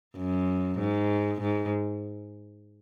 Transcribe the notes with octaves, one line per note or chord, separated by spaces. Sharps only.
F#2
G#2
G#2